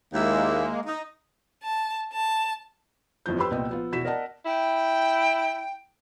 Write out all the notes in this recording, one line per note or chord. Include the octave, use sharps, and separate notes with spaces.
D#2 G#3 A#3 E4 E5
D#4
A5
A5
G1 F2 E3 F3 G6
G4 B4 C5 B5 C6 E6
C2 A#2 B3 D#5 G5
F3 B3 F4
E1 E4 F#4 B6 E7
A#4 D5 D#5 F#5 A5
E4 G5